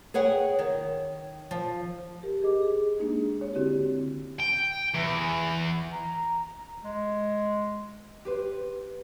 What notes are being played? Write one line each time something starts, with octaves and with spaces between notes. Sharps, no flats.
G#4 B4 C#5 F#5 G5
D#3 C#5
F3
G4 A#4
G4 G#4 D#5 D6
G#4
G#3 A#3 D4 D#4 G#4
C#5
D3 C4 E4 F#4 G4
G5
E2
A#5
G#3
G4 B4 C5